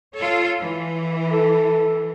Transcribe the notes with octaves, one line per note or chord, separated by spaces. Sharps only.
F4 A4 C#5
E3
A4